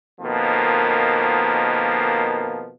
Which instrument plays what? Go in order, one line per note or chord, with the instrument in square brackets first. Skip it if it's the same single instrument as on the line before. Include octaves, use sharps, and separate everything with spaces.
[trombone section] F2 B2 D#3 F3 A#3